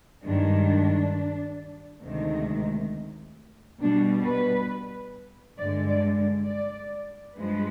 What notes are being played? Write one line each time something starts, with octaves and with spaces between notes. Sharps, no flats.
G2 D#3 G#3 D4
D2 C3 D#3 G#3
B2 G3 D4
B4
G2 D3 G#3 D5
D5
D5
G2 F3 G#3 B4